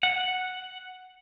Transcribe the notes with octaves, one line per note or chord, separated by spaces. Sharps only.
F#5